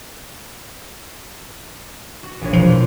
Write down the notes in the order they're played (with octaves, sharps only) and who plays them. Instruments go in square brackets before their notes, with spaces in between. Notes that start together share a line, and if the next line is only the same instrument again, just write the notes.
[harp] F#4
A#1 F4 C#5
[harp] E1 [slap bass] F3